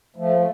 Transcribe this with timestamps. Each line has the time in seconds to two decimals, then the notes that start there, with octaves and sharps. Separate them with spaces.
0.16 F3 A3
0.37 A3